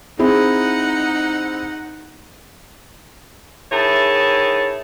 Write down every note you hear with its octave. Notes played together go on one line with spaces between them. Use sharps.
C4 D#4 E4 G#4 F#5
D#3 E4 G#4 C#5 A5